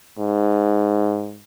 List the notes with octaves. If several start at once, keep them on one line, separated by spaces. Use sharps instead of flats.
G#2